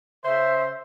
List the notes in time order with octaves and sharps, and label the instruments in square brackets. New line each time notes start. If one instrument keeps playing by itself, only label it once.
[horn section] C#3 C5 [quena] E5